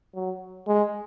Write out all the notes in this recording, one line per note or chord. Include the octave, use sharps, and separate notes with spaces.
F#3
G#3